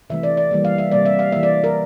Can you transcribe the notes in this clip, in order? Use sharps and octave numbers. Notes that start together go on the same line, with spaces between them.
C3 E3 A3 E5
D5
D5
E3 G3 A#3
F5
E5
C3 G3 A#3 D5
E5
F5
E3 A#3 E5
D5
A#4